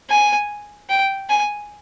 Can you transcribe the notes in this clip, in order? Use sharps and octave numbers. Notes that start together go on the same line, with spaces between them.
G#5
G5
G#5